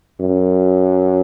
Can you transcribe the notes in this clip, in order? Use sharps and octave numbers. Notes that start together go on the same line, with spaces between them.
F#2